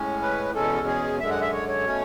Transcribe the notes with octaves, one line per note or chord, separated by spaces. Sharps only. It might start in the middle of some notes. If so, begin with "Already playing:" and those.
Already playing: A2 G#3 C#4
B4
E2 B2 G#3 C#4 A4
G#4
F#2 D3 G#3 E5
F#5
E5
C#5
C#5
B2 A3 C#4